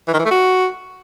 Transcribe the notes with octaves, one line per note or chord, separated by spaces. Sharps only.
E3
D#3
E3
A3
F#4